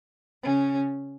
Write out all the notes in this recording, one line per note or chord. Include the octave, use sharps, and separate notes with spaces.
C#3 C#4